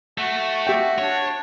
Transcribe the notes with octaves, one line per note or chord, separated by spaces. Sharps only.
A3 F#4
G4 E5 G5
D4 C#5